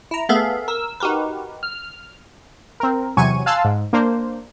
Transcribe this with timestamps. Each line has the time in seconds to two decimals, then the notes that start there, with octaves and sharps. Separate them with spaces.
0.11 E4 A#5
0.29 A3 B3 G#4 A4 E5 F5
0.68 A#4 E6
1.00 D#4 F#4 G4 A#4 B4
1.63 F6
2.80 C4 A#4
3.17 E2 C3 F#3 G#5 C#6 D#7
3.46 F5 G#5 A5 C6 E6 F#6
3.65 G#2
3.93 A#3 D4 C5